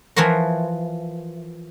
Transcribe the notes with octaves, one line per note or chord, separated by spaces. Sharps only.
E3 F3 F4 F#4 A#4